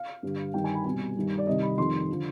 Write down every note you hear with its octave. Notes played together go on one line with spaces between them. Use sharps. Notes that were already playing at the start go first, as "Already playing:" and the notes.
Already playing: F5
G2 D3 G3
G2 D#3 G3 G5
G#5
B5
C2 B2 G3 G#5
G2 D#3 G3
D5
C2 C3 D#3 G3 D#5
B5
F2 D#3 G3 C6
D3 F3